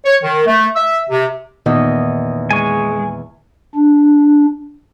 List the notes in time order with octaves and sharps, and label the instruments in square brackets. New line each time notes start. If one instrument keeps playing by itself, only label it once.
[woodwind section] C#5
D#3
A3
E5
C3
[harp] E2 [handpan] A#2 D#3 D#5
[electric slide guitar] G#3 [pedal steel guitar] G#5 C#6
[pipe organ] D4